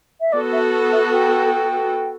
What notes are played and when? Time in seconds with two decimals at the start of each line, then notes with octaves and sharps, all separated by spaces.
0.20 E5
0.32 B3 F#4 A4 D5
0.52 E5
0.92 E5
1.12 G5